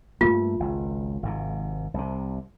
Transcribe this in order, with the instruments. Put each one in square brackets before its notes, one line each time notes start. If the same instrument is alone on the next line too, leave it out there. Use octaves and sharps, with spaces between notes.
[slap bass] G2 A3 A#3 [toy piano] F4
[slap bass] G#1 C#2
G#1 G#2 C3
C2 C3